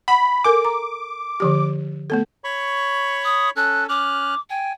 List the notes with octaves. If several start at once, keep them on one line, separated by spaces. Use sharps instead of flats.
F#5 B5
A4 A#4 G#5 D6
A#5
D3 F3 G4
A3 B3 A4
C#5 B5 C#6
D#6
C#4 A4 F#6
C#4 D6 F6 F#6
G5 G#5